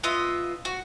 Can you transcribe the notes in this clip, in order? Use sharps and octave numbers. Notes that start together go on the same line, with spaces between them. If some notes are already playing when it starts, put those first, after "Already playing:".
B3 F4 D#5 E5
F#4